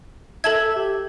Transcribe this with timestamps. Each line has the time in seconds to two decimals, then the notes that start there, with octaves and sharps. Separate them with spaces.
0.44 A4 E5 A5 G#6
0.76 G4